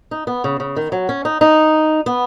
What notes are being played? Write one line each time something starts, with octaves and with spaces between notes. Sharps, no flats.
D#4
B3
C#3
C#3
D#3
F#3
C#4
D#4
D#4
B3